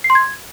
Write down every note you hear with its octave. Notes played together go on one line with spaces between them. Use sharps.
C7
C6
G#6